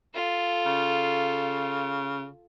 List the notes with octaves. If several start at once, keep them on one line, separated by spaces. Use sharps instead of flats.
F4 A4
C#3